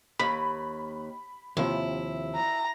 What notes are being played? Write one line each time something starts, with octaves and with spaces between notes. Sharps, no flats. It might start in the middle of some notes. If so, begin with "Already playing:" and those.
D#2 B5
D#2 C3 F3 E4
A#5